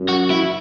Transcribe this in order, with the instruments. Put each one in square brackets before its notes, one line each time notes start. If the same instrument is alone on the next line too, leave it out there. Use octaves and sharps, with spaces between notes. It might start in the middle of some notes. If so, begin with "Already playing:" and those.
Already playing: [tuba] F#2
[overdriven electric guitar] F#4
E4